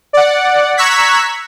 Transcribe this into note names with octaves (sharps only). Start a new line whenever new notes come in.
D5 F#5
A#5 C#6 E6 F#6 G#6 B6